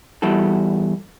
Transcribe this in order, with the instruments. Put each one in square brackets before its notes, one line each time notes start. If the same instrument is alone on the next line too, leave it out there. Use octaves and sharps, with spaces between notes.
[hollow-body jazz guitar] E2 G3 E4 F#4 A4